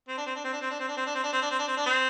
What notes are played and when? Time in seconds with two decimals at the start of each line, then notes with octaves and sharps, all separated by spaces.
0.08 C4
0.17 D4
0.26 C4
0.35 D4
0.44 C4
0.53 D4
0.61 C4
0.70 D4
0.80 C4
0.88 D4
0.97 C4
1.06 D4
1.15 C4
1.23 D4
1.33 C4
1.42 D4
1.51 C4
1.59 D4
1.67 C4
1.77 D4
1.86 C4